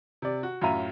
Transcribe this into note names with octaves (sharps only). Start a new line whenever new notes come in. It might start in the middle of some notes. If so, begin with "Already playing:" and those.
C3 D5
F#4
F#2 A2 F4 E5 A#5 D#7